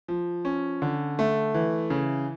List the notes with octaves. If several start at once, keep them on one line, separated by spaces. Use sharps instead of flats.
F3
C#4
D3
A3
E3
C#3